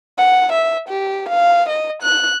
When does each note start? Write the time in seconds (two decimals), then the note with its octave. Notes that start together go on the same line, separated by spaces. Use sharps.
0.18 F#5
0.53 E5
0.89 G4
1.29 F5
1.69 D#5
2.02 F#6